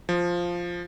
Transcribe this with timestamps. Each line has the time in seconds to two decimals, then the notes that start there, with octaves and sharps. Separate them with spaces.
0.09 F3